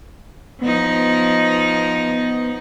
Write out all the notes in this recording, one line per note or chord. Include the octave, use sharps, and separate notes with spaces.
F3 B3 D#4